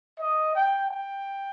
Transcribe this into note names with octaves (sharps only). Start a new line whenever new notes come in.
D#5
G5
G5